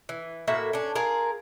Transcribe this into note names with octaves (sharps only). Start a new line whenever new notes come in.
E3
A2 A#3 F#4 E5
C#4 D4
F4 G#4 A#4